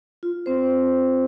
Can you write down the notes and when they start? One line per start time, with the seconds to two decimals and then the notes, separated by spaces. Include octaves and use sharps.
0.23 F4
0.46 C4 C5